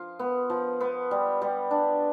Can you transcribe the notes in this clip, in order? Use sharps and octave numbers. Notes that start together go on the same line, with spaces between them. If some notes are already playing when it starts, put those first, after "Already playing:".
Already playing: F3 F4
B3
F3
B3
G3
G3
D4